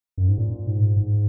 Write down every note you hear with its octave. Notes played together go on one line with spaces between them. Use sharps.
F#2
G#2
A#2
G#2
G#2